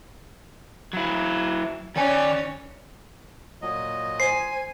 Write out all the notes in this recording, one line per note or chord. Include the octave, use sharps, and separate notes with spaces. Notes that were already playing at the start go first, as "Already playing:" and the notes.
F#3 E4
D#3 C#4 D5 G#5
A#2 F#3 D#5
C5 G#5 C7